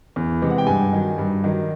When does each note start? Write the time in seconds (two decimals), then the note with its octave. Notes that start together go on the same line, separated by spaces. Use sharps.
0.16 E2
0.42 C3 E3 G#3
0.50 F#5
0.58 G5
0.67 G2 G#5
0.93 D#3 F#3
1.18 G2
1.44 D#3 F#3